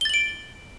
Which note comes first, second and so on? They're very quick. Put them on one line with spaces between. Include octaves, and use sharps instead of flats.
G7 A6 F#7 D7